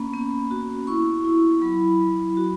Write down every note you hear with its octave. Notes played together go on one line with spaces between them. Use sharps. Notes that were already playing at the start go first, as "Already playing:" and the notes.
Already playing: A#3 C#4 B5
B3
F#4
E4 C#6
E4
F#3 B5
F#3
F#4